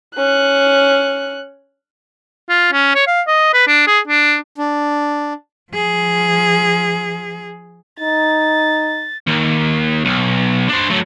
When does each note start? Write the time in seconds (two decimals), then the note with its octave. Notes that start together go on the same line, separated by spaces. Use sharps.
0.16 C#4 F#6
2.49 F4
2.72 C#4
2.95 C#5
3.07 F5
3.27 D#5
3.53 B4
3.67 D4
3.87 G#4
4.07 D4
4.58 D4
5.72 F3 G#4
8.00 D#4 A6
9.27 D#2
10.05 B1
10.69 D4 C5
10.89 A2 F#3